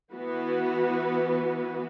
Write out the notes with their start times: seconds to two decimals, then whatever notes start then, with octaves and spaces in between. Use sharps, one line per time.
0.12 E3 B3 F#4 B4